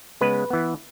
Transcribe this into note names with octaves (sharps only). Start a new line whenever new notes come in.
C#3 G#3 B3 B4
E3 B3